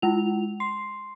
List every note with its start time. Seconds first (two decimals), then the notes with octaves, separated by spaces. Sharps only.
0.02 G#3 E4 F4 F7
0.60 C6 C7